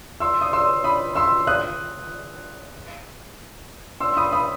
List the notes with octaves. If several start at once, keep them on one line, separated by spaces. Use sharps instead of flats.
C6 E6
D#6
C6 E6
B5 D#6
C6 E6
D#6 F#6
C6 E6
B5 D#6
B5 D#6